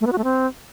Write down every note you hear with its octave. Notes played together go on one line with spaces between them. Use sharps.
A3
B3
F#4
A3
C4